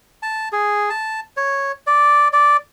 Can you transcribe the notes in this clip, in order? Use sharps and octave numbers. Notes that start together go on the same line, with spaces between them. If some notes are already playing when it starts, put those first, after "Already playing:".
A5
G#4
A5
C#5
D5
D5